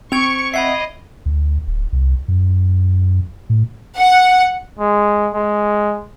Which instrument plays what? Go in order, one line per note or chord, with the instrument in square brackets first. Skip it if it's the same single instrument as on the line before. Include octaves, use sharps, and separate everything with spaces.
[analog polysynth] C4 [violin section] C#6 [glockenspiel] G#6 D7 F7
[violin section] D#5 [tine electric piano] E5 F#5 [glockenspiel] B5 G#6 C7
[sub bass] D2
D1
C2
F#2
A2
[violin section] F#5
[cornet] G#3
G#3